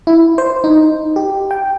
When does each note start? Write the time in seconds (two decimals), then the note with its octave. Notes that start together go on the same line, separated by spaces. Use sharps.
0.07 E4
0.38 C5
0.64 D#4
1.16 G4
1.51 G5